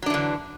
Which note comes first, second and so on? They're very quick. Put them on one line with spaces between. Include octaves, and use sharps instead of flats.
F#3 D4 E3 D3